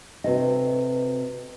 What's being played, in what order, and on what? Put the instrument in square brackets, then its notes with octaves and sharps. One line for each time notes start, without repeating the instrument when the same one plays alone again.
[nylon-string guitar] C3 F#4 A4 B4 D#5